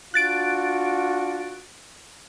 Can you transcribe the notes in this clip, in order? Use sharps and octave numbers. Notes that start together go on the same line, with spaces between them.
D4 F4 F#4 F#6 A6 D7